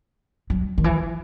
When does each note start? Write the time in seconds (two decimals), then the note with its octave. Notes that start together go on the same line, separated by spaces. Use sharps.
0.50 F#3
0.78 D#3
0.84 E3